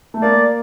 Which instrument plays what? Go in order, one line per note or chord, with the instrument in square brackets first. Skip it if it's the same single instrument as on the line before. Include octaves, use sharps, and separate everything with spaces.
[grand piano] A3
[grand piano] A#3 [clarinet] D5